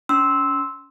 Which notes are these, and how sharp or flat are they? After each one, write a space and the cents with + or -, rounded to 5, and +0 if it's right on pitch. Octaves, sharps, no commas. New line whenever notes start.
C#4 +25 C6 +0 E6 -10